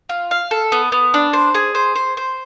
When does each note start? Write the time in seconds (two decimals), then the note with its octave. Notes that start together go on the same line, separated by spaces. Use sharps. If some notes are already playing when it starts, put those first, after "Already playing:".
0.09 F4
0.31 F5
0.51 A4
0.72 B3
0.92 B3
1.14 D4
1.33 C5
1.55 G#4
1.75 C5
1.96 C5
2.17 C5